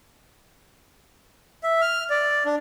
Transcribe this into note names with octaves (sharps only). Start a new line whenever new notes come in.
E5
F6
D5
D4